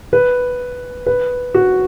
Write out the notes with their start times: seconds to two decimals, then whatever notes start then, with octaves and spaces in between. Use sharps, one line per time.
0.13 B4
1.06 B4
1.54 F#4